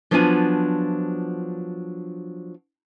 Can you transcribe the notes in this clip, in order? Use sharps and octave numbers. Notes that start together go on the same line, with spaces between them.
F3 F#3 B3 D4 F4 G#5